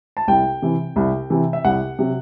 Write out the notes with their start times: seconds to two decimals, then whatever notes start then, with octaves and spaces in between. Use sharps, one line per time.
0.17 A5
0.28 C2 G5
0.62 C3 E3
0.96 C2
1.30 C3 E3
1.53 E5
1.64 C2 F#5
1.99 C3 F#3